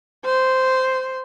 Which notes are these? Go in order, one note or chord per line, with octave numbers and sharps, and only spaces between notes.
C5